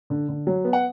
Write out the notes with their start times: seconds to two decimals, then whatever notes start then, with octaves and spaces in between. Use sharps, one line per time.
0.10 D3
0.29 D3
0.47 F#3
0.64 B3
0.73 F#5